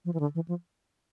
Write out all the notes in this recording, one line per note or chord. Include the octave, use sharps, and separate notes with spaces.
F3
E3
D3
E3
F3